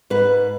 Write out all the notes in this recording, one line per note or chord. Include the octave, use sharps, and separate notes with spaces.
G#2 B4